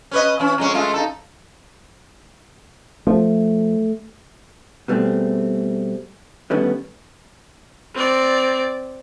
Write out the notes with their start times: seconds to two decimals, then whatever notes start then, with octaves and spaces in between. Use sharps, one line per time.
0.11 C#4 B4 D#5
0.40 E3 C#4
0.58 F2 G#3 C#4
0.74 G#3 A3 F4
0.94 D#4 E4 A4
3.07 F3 A3
4.88 B2 G3 A3 C4 G#4
6.50 D3 D#3 G3 A3 B3 C#4
7.94 C4 D5